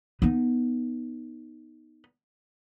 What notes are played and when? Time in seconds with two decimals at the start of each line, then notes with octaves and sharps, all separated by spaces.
0.22 B3 D#4